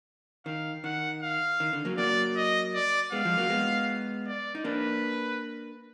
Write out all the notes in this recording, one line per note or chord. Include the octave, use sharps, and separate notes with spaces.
D#3 F5
D#3 F#5
F5
D#3
D3
F#3 A#3
F#3 A#3 D5
D#5
D5
G#3 B3 F5
F3 G#3
F#3 A#3
G#3 B3
D5
D#4
A#3 D4 B4